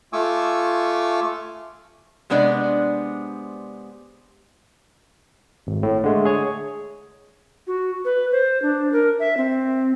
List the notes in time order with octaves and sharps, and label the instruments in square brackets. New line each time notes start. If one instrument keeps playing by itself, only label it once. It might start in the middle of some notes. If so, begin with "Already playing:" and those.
[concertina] A3 F4 G#5 C#6 D6 E6
[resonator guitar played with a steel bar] C3 G#3 B3 D4 D5
[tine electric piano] G#1
A2
D3 G#3 A3
G#4 C#5
[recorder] F#4
B4
C5
D4
A#4
E5
C4